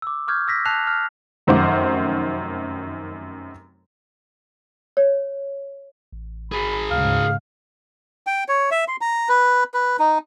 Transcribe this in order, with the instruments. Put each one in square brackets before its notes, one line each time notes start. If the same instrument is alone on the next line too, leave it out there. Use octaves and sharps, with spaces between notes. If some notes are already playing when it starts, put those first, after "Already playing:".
[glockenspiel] D6 E6
C#6 D6 F6 G6 G#6
E6 A#6 B6
A5 E6 F#6 C7 F7
F6
[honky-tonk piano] F1 F#2 D#3 C5 F#5 D6
[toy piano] C#5
[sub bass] A1
[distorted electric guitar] G#4 A#4 [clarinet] B5
[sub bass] D2 [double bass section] G#2 C#3 [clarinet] F5
[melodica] G5
C#5
E5
C6
A#5
B4
B4
D#4